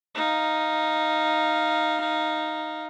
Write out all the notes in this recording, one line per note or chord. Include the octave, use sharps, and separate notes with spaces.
D#4 F5